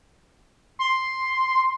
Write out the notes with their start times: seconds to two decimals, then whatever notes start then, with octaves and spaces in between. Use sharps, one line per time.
0.79 C6